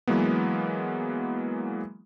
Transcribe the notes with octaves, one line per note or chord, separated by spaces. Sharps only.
E3 F#3 G#3 A#3 B3